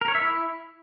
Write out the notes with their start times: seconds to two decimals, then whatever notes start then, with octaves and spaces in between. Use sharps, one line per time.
0.01 A#4
0.08 C#5
0.15 E5
0.21 E4